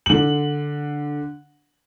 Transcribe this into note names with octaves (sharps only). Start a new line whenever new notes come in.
D3 F#7